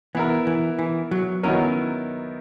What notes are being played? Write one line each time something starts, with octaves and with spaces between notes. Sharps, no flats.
E3 B3 E4 A#4
E3
E3
F#3
D#3 F#3 B3 C#4 E4 A#4